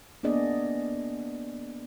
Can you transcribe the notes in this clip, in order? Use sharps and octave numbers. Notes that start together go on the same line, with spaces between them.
A#3 B3 D4 G#4 D5 D#5